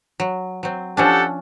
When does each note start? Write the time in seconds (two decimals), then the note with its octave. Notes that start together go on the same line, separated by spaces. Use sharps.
0.20 F#3
0.63 F#3 C4
0.97 F3 C#4 D4 G4 A4 F#5